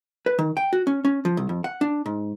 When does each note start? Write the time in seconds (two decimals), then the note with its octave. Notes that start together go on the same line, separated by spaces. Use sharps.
0.26 B4
0.39 D#3
0.57 G5
0.73 F#4
0.87 C#4
1.05 C#4
1.25 F3
1.37 C2
1.49 F2
1.64 F#5
1.81 D4
2.06 G#2